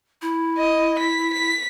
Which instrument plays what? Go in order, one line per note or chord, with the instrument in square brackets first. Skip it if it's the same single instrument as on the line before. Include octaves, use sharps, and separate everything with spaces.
[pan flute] E4
[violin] D#5
B6
B6